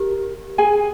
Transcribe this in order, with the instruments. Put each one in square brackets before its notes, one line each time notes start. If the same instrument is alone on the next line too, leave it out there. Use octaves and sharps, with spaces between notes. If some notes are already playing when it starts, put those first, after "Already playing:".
Already playing: [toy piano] G4 [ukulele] A#4
[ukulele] G#4 G#5